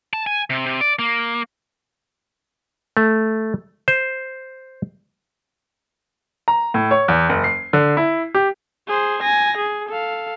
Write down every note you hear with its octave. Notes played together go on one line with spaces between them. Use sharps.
A5
G#5
C3
C3
D5
A#3
A3
C5
A#5
A2
C#5
E2
F#1
C7
D3
E4
G4
G#4 C5
G#5 A#6
G#4
A4 F5